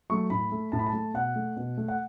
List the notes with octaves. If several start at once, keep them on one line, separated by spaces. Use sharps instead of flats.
F#3 A3 C#6
A2 B5
A3
A2 A5
B5
A5
A3
B2 F#5
A3
B2
A3
F#5